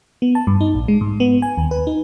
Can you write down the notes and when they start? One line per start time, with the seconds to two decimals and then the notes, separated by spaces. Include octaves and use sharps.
0.22 B3
0.35 A5
0.47 G2
0.61 D#4
0.75 A#1
0.88 G#3
1.01 G#2
1.20 B3
1.42 G#5
1.57 D#2
1.71 B4
1.87 D#4